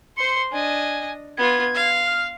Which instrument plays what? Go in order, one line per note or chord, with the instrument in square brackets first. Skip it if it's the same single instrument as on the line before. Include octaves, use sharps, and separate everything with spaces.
[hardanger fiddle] C5 C6 [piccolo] C#7
[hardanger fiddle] D4 D#5 [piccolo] G#5
[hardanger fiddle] B3 F4 [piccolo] G#6
[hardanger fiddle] F5
[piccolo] F6